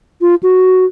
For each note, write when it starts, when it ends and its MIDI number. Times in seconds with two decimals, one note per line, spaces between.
0.21 0.35 65
0.43 0.85 66